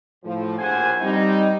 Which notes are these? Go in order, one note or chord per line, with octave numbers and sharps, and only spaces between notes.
A2 F3
A#1 D#2 C5 F#5 G#5
G3 C4 D#4